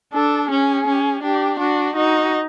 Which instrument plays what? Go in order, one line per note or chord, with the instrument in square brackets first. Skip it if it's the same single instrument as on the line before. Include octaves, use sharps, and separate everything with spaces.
[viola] D4 [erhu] A4
[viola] C#4 [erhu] G#4
[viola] C#4
[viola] D4 [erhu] G4
[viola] D4 [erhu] F#4
[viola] D#4 [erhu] F#4